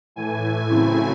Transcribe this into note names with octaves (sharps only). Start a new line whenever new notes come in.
A2 E3 A3 G#5
C#3 F#3 A3 C4 E4